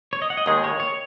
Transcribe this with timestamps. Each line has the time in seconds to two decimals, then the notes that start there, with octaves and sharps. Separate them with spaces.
0.13 C#5
0.22 D#5
0.30 F#5
0.37 D#5
0.46 D#2 D#3 G#3 G#4
0.64 C#5
0.80 C#5